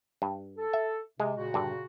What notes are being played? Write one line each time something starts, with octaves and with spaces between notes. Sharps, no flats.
G2
A4
E5
C3 G#3
A#2 C#3 F#4
G2 D3